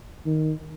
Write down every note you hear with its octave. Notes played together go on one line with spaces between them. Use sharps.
D#3